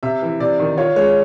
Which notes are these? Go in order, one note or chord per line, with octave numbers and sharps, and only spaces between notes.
C3 E5
E3
C3 D5
D#3
F4 C#5
G#3 C#5